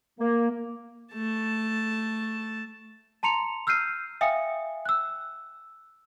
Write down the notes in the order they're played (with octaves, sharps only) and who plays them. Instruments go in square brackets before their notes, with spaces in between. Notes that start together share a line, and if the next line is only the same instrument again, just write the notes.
[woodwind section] A#3
[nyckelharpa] A3 A5
[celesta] A5 A#5 C6 C#7 F7
E6 F6 G6 C7 D#7
E5 F5 G5 G#5 D#6 C#7
E6 F#6